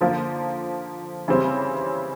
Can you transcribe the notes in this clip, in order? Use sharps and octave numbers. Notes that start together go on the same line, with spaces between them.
D3 F3 A#3
C#3 E3 G3 C4